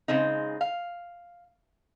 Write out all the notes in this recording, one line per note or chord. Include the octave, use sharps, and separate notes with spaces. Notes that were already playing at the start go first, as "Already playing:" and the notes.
C#3 G#3 C4 D#4
F5